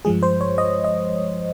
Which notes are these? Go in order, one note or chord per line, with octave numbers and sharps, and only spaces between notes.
G2 F3 G#3 G#4
C5
C#5
D#5
D#5